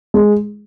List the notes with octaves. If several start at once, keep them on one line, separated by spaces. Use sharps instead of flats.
G#3